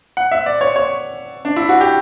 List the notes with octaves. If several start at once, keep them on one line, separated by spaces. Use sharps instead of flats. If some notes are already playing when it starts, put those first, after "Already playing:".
F#5
E5
D5
C#5
C#5
D4
E4
F#4
G4